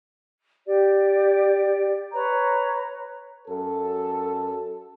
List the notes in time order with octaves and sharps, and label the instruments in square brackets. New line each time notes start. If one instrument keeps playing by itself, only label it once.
[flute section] G4 D5
B4 C#5 A#5
[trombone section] F#2 A4